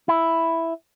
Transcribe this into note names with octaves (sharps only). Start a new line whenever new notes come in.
E4